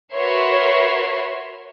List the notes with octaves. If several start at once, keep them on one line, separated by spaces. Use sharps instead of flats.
F#4 A#4 B4 C#5 E5 C6